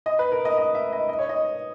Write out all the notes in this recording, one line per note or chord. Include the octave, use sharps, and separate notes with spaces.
D#5
B4
A#4
D#5
D#5
E5
D#5
D#5
C#5
D#5